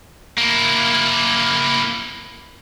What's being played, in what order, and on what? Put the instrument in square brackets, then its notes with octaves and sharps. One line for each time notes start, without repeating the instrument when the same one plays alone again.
[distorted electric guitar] A#3 E4